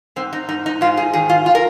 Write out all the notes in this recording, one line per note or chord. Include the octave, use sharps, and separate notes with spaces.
G#2 C4
D#4
G#2 D#4
D#4
G#2 F4
G#4
D#3 G#4
F4
F4
A#4